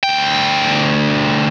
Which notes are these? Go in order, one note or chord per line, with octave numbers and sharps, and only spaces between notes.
D2 G5